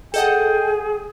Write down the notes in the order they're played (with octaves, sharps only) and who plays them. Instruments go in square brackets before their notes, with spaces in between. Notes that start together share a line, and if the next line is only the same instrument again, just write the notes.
[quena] G#4 [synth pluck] A4 D#5 F#5 [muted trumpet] G5